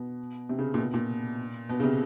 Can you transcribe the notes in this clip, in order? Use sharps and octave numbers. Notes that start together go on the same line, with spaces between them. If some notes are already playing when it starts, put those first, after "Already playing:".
Already playing: B2
C3
C#3
A#2
B2
A#2
B2
C#3
C3